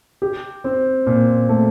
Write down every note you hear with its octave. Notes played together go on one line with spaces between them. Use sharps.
G4
C4
A#2
A3